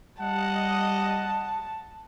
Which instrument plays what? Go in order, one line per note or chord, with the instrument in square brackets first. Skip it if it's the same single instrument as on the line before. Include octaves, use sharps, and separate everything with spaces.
[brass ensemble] G3 D#5 [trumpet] F#5 [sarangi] A5